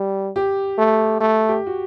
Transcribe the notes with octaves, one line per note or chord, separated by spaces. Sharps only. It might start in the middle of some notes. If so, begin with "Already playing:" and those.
Already playing: G3
G4
A3
A3
G4
F#4